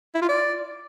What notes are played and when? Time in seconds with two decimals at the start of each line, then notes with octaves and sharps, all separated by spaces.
0.15 E4
0.22 F4
0.29 D5